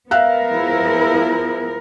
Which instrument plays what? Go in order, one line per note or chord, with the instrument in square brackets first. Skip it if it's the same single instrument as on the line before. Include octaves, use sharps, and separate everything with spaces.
[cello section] B3 A#4 [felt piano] E5 F5 F#6
[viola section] F3 E4 G#4